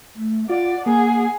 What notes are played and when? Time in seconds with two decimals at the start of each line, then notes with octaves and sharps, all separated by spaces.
0.15 A3
0.50 F4 D5 F#5
0.86 A#3 G#4